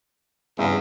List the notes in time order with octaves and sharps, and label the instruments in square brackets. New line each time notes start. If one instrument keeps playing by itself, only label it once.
[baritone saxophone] E2 [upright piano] G2 C#3